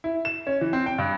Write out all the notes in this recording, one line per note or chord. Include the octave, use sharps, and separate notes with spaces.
E4
E7
C#4
E3
C4
G5
G2